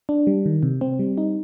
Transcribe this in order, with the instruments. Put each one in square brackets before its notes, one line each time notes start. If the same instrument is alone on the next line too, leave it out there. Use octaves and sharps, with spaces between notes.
[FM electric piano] D4
G3
D#3
C3
C4
G3
D#4